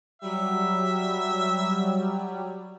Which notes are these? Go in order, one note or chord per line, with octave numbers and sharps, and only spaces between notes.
F#3 G3 E5